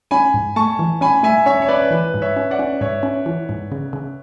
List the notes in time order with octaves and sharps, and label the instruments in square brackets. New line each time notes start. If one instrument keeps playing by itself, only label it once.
[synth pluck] C#4 [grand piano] G#5 B5
[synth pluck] G#2
[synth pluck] A3 [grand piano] A5 C#6
[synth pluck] E3
[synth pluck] C#4 [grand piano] G#5 B5
[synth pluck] A3 [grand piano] E5 G#5
[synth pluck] C#4 [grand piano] C#5 E5
[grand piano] C#5
[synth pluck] C#4 [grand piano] B4 D5
[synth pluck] E3 [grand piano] B4
[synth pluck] G#2
[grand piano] C#5 E5
[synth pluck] C#4
[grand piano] D5 F#5
[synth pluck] C#4
[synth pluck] G#2 [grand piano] C#5 E5
[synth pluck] C#4
E3
G#2
C#3
C#3